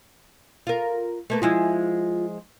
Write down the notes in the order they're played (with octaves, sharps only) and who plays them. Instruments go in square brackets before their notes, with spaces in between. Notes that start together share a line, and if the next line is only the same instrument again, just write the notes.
[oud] F4 A#4
A3 A#3 B4
[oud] F3 G#3 E4 [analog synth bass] F4